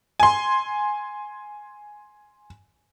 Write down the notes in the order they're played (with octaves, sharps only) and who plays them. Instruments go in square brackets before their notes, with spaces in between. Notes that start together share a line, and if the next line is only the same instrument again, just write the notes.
[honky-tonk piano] G#5 C6